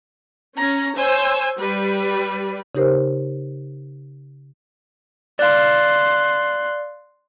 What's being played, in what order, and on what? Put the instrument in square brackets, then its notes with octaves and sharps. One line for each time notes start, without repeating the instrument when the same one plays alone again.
[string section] C#4 [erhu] A#5
[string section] C5 C#5 E6 [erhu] G#5
[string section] G3 [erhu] B4
[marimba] C#3 D#4 G4 A#4 C5
[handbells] D5 F5 [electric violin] C6 F#6